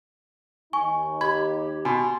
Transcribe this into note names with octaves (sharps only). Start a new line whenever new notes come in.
D#2 D#4 G#5 C#6
G4 B5 G#6
B2 G#5 C6